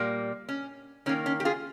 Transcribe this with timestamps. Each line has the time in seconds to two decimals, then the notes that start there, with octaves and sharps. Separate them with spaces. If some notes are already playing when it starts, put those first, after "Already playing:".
Already playing: A#2 G3 A#3
0.49 C#4
1.06 D#3 C#4
1.09 A#3
1.26 C#4
1.40 G4
1.45 F4 G#4